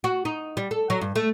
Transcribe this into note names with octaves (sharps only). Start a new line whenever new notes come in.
F#4
D#4
G3
A4
F#3
G2
A3